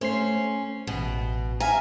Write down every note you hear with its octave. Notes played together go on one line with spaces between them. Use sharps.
A3 C#4 C5 C7
A1 B2
E5 F5 G#5 A#5